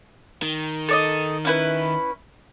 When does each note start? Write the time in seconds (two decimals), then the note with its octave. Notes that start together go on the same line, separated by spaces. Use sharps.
0.42 D#3
0.89 A4 D5 D#5
1.45 C#4 E4 B4